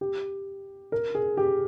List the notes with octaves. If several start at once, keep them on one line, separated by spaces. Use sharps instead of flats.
G4
A#4
G#4
G4